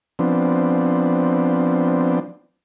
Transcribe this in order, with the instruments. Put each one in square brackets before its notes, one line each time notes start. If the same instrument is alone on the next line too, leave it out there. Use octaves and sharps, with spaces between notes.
[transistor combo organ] F3 B3 C4 D4